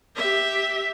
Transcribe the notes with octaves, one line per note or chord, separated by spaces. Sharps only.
G4 E5